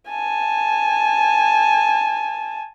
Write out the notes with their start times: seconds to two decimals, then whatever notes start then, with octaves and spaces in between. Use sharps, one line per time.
0.10 G#5 A5